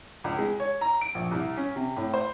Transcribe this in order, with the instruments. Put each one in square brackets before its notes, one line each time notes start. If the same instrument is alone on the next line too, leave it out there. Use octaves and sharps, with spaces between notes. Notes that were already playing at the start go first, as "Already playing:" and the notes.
[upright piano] C#2
G#3
C#5
A#5
D7
A#1
C2
C#4
C3
A2
C5